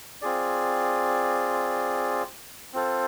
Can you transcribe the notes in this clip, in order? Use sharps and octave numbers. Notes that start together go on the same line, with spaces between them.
C4 F4 G#4 D5
C4 F4 A4 C5